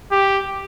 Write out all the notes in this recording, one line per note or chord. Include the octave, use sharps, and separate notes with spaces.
G4